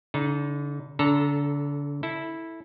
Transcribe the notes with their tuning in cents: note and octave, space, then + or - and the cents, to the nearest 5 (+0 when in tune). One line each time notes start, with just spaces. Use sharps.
D3 -35 D#4 +10
D3 -30 A4 +0 A#5 +5
E4 -10 A4 +0